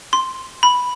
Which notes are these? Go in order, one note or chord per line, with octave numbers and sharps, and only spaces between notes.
C6
B5